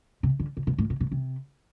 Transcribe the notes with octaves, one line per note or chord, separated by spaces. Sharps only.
C3
D3
C3
B2
A2
B2
B2
C3